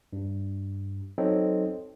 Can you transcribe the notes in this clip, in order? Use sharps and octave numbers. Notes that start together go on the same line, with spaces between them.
G2
F#3 C4 D#4 A4 C#5 D#5